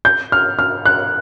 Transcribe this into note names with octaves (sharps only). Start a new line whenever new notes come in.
G6
F6
F6
F#6